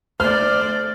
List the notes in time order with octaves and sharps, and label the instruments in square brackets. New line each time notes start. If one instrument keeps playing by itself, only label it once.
[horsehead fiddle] A3 D5 [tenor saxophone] C5 [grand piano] F6